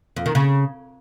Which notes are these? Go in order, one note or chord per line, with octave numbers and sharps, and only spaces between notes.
F2
D#3
C#3